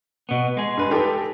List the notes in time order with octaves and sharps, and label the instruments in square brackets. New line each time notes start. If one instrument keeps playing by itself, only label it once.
[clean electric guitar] B2 B3
G#3 G#4
[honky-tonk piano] G2 B4
D#4 G4 A4